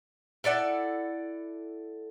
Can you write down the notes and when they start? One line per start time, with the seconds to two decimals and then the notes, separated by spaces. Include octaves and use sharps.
0.44 E4 A4 D5 F#5